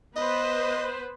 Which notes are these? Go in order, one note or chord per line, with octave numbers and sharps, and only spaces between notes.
B3 B4 C5 D#5